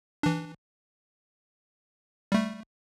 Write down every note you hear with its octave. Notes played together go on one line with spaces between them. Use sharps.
E3 D4
G3 A3